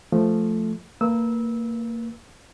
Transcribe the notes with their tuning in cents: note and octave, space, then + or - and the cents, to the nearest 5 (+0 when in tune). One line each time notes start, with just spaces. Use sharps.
F3 +0 A3 +0
A#3 -25 B4 -35 E6 -20